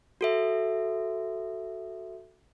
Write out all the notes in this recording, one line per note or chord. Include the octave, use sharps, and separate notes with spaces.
F#4 A4 E5